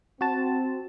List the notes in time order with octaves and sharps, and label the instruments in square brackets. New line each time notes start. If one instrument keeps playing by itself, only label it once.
[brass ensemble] C4 [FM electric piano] F#4 A5